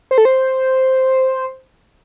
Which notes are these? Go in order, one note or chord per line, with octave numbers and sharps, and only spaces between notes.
C5
A4
C5